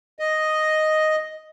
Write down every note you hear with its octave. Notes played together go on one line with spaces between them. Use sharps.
D#5